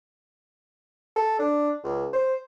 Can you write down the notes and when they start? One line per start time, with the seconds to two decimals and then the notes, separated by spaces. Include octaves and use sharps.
1.16 A4
1.39 D4
1.83 C#2
2.13 C5